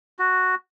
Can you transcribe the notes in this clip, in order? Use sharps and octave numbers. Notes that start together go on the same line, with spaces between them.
F#4